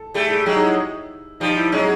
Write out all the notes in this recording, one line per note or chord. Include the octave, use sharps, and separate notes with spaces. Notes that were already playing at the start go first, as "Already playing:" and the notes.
Already playing: A4
G3 A3 G#4
G#4
F#3 G#3 G4
D#4
E4
F3 G3 D#4
E4
F#3 G#3 C#4